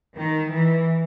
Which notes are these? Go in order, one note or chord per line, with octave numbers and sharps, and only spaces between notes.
D#3
E3